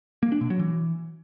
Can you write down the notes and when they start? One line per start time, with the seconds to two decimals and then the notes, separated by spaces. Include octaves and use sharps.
0.23 A#3
0.32 D4
0.41 B2
0.50 F#3
0.59 E3